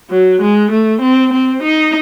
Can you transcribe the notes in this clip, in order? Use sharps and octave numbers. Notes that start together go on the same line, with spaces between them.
F#3
G#3
A3
C4
C4
D#4